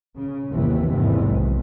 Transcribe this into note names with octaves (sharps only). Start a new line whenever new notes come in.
C#3
G1 D#2 C3 E3
E2 G#2 C3 D#3 E3
B1